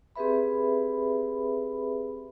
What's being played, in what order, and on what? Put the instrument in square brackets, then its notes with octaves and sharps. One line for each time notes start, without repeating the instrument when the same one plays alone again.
[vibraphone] C4 G4 G#4 B4 E5 B5